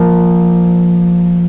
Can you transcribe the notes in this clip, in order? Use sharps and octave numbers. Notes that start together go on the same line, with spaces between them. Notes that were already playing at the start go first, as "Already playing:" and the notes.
Already playing: F3 A#3